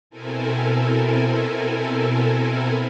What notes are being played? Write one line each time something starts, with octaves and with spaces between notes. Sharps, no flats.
B2 C4 E4 A4 A#4 G#5